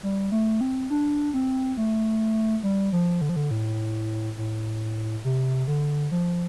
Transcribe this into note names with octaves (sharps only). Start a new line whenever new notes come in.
G3
A3
C4
D4
C4
A3
G3
F3
D3
F3
D3
A2
A2
C3
D3
F3